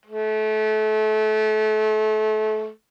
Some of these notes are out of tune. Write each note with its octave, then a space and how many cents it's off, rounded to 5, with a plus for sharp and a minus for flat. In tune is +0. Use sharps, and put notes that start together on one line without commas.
A3 -30